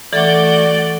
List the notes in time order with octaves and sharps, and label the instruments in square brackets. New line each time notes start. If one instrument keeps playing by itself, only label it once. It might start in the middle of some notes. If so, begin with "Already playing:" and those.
[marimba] E3 A4 A6 [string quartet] A3 F#4 G6 [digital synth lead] D5